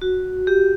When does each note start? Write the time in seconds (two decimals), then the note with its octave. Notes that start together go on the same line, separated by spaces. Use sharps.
0.01 F#4
0.47 G4